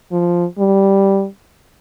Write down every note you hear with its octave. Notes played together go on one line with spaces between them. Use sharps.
F3
G3